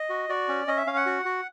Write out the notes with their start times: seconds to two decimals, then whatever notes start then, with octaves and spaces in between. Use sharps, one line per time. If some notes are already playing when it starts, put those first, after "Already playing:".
Already playing: D#5
0.10 F#4
0.29 F#4 D5
0.48 C#4
0.67 C#4 D#5
0.77 E5
0.87 C#4 F5
0.97 F#5
1.06 F#4
1.25 F#4